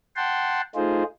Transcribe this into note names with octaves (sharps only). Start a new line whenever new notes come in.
F#5 G5 A5 C6
A3 D#4 F4 G#4 C5